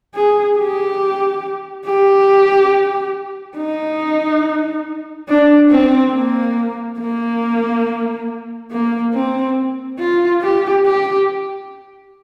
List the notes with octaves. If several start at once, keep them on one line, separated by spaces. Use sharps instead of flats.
G#4
G4
G4
D#4
D4
C4
A#3
A#3
A#3
C4
F4
G4
G4